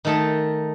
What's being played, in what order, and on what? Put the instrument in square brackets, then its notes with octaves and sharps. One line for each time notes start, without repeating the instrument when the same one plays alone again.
[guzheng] D#3 A3 D#4 A4